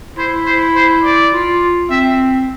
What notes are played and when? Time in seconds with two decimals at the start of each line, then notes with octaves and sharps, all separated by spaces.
0.17 E4 C5
0.46 C5
0.75 C5
1.03 D5
1.33 F4
1.90 C4 E5